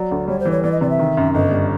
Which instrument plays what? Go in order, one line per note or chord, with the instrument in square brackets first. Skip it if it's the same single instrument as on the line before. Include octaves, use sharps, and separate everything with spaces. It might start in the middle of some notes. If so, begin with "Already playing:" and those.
Already playing: [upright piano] F#3 [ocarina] D5
[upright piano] D2
[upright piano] G3 [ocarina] C#5
[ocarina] C5
[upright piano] E3
[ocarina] C#5
[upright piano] E3 [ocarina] D5
[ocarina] D#5
[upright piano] C3 [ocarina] D5
[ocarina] E5
[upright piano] D#3
F#2
[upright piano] G1 [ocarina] D#5
[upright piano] G3